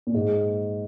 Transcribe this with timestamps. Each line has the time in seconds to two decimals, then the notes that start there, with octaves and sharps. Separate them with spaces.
0.07 A#2
0.14 G#2